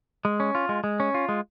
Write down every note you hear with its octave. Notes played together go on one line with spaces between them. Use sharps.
G#3
C#4
F4
G#3
G#3
C#4
F4
G#3